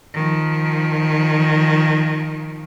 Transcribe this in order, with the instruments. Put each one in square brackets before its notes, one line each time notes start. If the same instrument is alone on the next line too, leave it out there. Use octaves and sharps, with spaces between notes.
[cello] D#3 F3